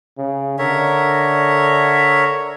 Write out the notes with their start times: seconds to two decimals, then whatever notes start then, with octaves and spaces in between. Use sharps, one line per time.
0.18 C#3
0.59 D3 A#4 C#5 E5